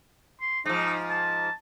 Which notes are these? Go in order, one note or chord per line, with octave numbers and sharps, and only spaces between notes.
C6
G#2 F3 D#4
A5